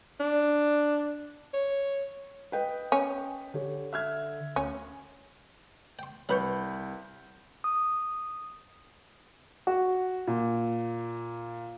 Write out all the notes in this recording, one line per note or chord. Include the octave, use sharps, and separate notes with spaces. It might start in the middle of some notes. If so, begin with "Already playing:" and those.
D4
C#5
B4 D#5 G5
C#4
D3 G4 C#5
E5 F6 G#6
D2 C#4
G5 C6
C2 F#3 B4 B5 C#6 G6
D#6
F#4
A#2